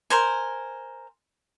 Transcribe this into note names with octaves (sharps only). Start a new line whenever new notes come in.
A#4 C5 G#5